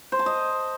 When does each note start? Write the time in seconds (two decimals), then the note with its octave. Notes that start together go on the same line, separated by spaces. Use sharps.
0.12 C5
0.19 A5
0.26 D#5